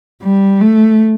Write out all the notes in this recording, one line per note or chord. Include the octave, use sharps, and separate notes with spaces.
G3
A3